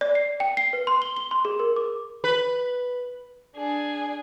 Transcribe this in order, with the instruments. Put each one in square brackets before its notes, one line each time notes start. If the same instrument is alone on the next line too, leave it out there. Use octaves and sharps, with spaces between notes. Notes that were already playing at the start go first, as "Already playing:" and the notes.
[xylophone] D5
C7
G5
C7
B4
C6
G7
G7
C6
G#4
A#4
D6
[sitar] B4
[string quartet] D4 G#4